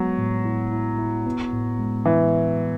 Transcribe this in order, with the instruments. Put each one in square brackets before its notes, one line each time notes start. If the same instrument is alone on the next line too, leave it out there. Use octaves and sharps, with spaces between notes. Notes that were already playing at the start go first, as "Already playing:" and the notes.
Already playing: [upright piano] F#3 [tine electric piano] G#3 B3
[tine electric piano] A2
E4
E4
E4
B3
A2
G#3
[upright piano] E3 [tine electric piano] B3